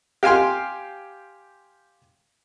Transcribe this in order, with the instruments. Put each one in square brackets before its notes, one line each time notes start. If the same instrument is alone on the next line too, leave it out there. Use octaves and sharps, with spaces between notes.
[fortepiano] G4 F5 G#5 C6 F6